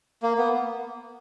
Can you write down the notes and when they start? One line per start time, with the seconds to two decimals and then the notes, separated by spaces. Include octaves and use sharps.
0.23 A#3
0.38 B3